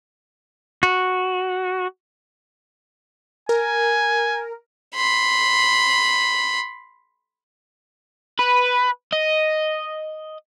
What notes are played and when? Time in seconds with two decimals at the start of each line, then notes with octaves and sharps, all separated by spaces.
0.83 F#4
3.49 A#4 G#5
4.95 B5 C6
8.39 B4
9.13 D#5